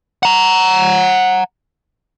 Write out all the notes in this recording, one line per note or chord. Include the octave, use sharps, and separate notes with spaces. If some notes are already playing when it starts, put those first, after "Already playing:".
F#5 A#5